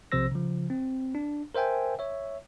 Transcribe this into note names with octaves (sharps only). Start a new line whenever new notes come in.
B1 C3 F3 C5 E6 A#6
C#3 F3
C4
D4
A#4 C5 E5 G5 G#5
C#5 E5